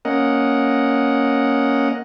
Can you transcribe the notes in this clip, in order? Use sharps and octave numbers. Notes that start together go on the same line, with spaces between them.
A#3 C#4 A#4 D#5 F#5